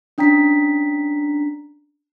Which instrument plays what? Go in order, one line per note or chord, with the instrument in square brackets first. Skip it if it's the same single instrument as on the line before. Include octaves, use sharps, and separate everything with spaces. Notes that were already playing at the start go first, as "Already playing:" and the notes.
[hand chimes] C#4 D4 G5 A#5 B6